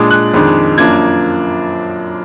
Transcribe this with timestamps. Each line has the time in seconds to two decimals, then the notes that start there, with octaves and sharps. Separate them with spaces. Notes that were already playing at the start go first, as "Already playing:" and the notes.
Already playing: A#2 G#3 D4 D#6
0.10 F#6
0.34 F2 D#3 G#3 D4
0.78 F#2 F3 A#3 D4 G#6